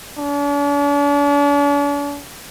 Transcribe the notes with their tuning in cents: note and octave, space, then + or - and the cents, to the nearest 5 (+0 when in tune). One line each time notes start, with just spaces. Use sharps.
D4 -45